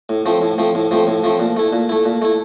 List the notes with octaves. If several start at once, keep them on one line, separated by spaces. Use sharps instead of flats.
A2
F3 A3 C4
A2
F3 A3 C4
A2
F3 A3 C4
A2
F3 A3 C4
A#2
A3 E4
A#2
A3 E4
A#2
A3 E4